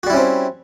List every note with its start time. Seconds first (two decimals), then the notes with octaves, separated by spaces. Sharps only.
0.03 F#4
0.07 G3
0.10 E4
0.13 C#4
0.16 C4